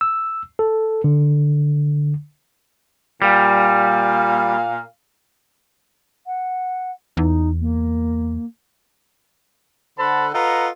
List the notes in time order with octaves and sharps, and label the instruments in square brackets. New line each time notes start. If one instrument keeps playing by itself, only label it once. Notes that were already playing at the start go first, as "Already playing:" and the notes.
[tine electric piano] E6
A4
D3
[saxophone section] A#2 F5 [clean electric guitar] G3
[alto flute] F#5
[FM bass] E2 [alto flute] D#4
[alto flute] A#3
[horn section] D3 A4 C5 F#5 A5 B5
F4 A4 B4 D#5 F#5 A#5